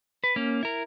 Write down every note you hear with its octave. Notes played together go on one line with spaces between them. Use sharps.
B4
A#3 C#4
E4 A#4